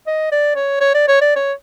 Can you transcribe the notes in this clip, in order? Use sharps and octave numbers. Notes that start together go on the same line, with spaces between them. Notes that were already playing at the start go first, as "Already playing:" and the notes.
D#5
D5
C#5
C#5
D5
C#5
D5
C#5